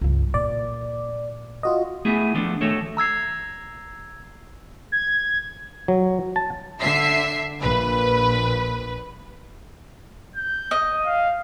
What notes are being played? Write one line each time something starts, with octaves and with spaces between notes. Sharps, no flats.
C#2 G2
A#2 D5
F4 F#4 D#5
A3 B3 E4 G#4 E5
D#3 F3 A3 B3 D4
D#3 A3 F#4 A4 C#5
A#5 E6 G#6 C7
G#6
F#3
A5
D3 E5 C7
A#1 B4
G6
D#5
F5